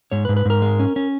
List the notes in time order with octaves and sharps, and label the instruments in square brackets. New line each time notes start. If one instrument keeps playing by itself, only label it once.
[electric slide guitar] G#2 C#5
B4
G#2
B4
G#2 A#4
G#3
C#4
C#4